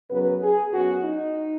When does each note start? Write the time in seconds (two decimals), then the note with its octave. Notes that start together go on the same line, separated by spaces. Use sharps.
0.10 F#2 C#3 F#3 B3 B4
0.42 G#4
0.73 F#2 F#3 B3 F#4
1.04 D#4